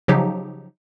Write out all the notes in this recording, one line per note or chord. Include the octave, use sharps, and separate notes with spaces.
C#3 F3 F#3 D#4 G4